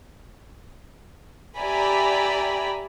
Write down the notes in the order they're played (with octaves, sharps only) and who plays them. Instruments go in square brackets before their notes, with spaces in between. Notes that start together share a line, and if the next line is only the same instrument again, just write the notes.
[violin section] G4 D5 E5 G#5 A#5 B5